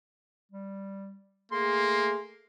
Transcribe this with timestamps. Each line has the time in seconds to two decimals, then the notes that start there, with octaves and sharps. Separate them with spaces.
0.52 G3
1.52 A3 A#3 G#4 C6